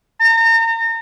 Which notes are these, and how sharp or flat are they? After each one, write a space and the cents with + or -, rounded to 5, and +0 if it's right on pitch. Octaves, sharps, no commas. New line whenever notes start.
A#5 -35